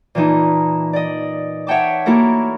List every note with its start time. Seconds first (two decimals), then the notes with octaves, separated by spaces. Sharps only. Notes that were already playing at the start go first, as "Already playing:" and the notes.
0.15 A#2 E3 D#4 A5
0.93 D5 D#5
1.67 C#5 E5 F#5 G5 A5 D6
2.06 A#3 E4 F#4 A4 A#4